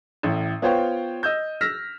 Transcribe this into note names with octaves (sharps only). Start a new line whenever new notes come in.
A1 A2
B3 F4 C5 C#5 F5 G5
D#5 E6 G6
E6 F6 A#6 B6